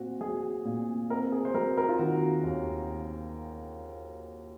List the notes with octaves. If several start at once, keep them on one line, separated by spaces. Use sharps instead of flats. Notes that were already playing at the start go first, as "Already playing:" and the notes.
Already playing: A#2 C4 F#4
F#3 G#4
A#2
C4 A#4
G#4
C5
F#3 A#4
A#4
F4
D#3 F#4
D#2